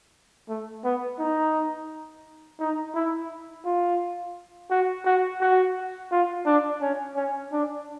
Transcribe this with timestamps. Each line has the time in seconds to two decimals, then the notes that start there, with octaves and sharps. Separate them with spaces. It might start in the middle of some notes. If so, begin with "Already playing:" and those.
0.49 A3
0.84 B3
1.19 D#4
2.60 D#4
2.95 E4
3.65 F4
4.71 F#4
5.05 F#4
5.41 F#4
6.12 F4
6.46 D4
6.81 C#4
7.16 C#4
7.52 D4